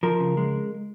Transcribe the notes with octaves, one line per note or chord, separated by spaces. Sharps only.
F3 A#4
C#3
G#3